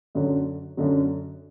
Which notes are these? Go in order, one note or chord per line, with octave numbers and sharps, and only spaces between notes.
F#2 D3 F#3
F#2 D3 F#3